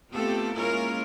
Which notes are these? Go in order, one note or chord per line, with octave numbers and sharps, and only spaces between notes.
A3 B3 C4 F4 G4 A4
G#3 A#3 C#4 E4 F4 A#4